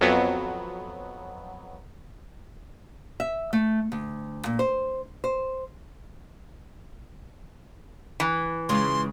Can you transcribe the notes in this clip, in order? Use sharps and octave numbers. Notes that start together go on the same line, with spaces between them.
F2 F#3 B3
E5
A3
D2
A#2
C5
C5
E3
C#3 G#3 F4 C6